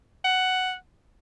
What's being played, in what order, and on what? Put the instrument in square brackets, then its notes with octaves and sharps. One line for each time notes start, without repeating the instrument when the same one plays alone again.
[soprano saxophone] F#5